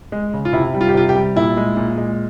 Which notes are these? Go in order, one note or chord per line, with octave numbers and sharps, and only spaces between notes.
G#3
C#3
F4
C3 E4
G3
F4
G4
C3 F4
G4
G3
A#2 E4
G#3
A#2
G#3